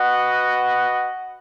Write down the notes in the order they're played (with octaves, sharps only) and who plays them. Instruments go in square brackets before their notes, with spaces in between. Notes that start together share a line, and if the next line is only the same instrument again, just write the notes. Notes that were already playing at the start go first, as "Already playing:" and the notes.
Already playing: [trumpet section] F#4 B4 D#5 F#5